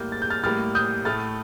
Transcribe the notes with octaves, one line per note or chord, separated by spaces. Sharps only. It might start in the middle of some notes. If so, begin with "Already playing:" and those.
Already playing: A2 G3 A#3 G6
A6
G6
F6 A6
A2 G3 A#3 F6 A6
D#6 G6
A2 A3 F6 A6